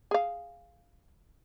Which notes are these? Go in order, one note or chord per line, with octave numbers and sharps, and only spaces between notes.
G#4 F5